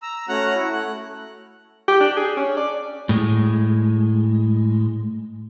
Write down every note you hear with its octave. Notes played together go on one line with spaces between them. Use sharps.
A#5 E6
A3 C#4 F#4 F#5 A#5 F#6
E4 F#4
A3 F#6
G4
D4
G#4
C#4
D5
A2 G#3